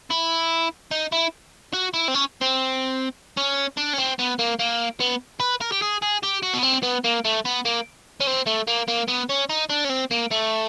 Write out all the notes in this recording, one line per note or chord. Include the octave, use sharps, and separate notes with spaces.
E4
D#4
E4
F#4
E4
C4
C#4
C4
C#4
D4
C#4
C4
B3
A#3
A#3
B3
B4
A#4
G4
G#4
G#4
G4
F#4
B3
C4
B3
A#3
A3
B3
A#3
C#4
C4
A3
A#3
A#3
B3
C#4
D#4
D4
C#4
C4
A#3
A3